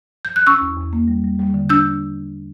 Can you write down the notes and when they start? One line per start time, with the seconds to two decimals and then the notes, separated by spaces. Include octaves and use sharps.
0.25 G6
0.36 F#6
0.47 C#4 C#6 E6
0.61 E2
0.78 E2
0.93 A#3
1.08 G3
1.24 G3
1.39 G3
1.54 D3
1.69 D4 E6 G6